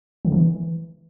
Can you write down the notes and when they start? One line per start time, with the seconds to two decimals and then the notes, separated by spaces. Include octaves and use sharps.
0.25 D3
0.32 E3